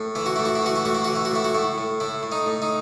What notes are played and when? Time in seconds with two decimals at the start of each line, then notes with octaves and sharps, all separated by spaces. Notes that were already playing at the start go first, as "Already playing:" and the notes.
Already playing: A2
0.15 E3 E4
0.26 F#4
0.36 A2 E4
0.45 F#4
0.55 E4
0.63 E3 F#4
0.76 E4
0.85 A2 F#4
0.95 E4
1.05 E3 F#4
1.15 E4
1.25 F#4
1.31 A2 E4
1.44 F#4
1.55 A2 E4
1.78 A2
2.00 A2 E4
2.23 A2
2.32 D#4
2.46 A2
2.62 D#4